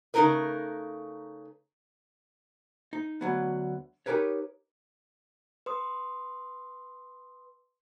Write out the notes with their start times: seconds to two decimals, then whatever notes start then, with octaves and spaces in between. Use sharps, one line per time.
0.14 C#3 A3 D#4 E4 A#4 B4
2.93 D#4
3.21 D2 F#3 B3
4.06 D#4 F4 G4 A#4 B4 C#5
5.66 B4 C6 D#6